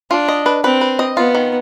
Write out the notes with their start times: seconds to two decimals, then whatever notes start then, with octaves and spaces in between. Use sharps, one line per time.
0.10 D4 F4
0.28 D#5
0.46 B4
0.64 C4 B4
0.81 B4
0.99 D#5
1.17 B3 F4
1.35 D#3